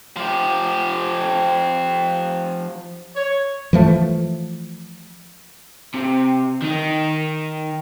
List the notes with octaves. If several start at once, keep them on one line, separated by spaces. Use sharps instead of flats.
F3 G4
C#5
E3 F3 A3
C3
D#3 D#4